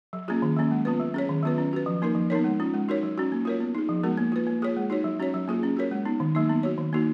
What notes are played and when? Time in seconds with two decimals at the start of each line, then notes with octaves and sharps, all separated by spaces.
0.13 F#3
0.28 A#3 C#4 F4 G#4
0.42 D#3
0.56 F#3 A#3 C#4
0.72 G#3
0.85 B3 F4 B4
1.00 F#3
1.14 C#4 G#4 C#5
1.29 D#3
1.43 F#3 B3 F4 B4
1.58 C#4
1.73 F#4 B4
1.86 F3
2.02 A#3 D#4 A#4
2.15 F3
2.30 B3 D#4 A#4 C#5
2.44 G#3
2.60 C#4 F4
2.74 G#3
2.89 D#4 F#4 A#4 C#5
3.03 F#3
3.18 C#4 F#4
3.32 A#3
3.45 F4 A#4 C#5
3.60 B3
3.75 D#4 G#4
3.89 F3
4.03 G#3 B3 F#4 A#4
4.17 A#3
4.32 F4 B4
4.47 A#3
4.62 F4 G#4 C#5
4.77 G#3
4.90 D#4 F#4 C#5
5.04 F#3
5.20 C#4 F#4 C#5
5.34 F#3
5.48 A#3 F4 G#4
5.63 C#4
5.77 F#4 A#4 C#5
5.91 G#3
6.05 B3 D#4
6.20 D#3
6.35 F#3 A#3 D#4
6.49 B3
6.63 F#4 C#5
6.78 D#3
6.93 A#3 D#4 F#4